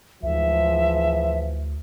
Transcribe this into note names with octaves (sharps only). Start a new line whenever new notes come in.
D2 G#2 E3 F3 E5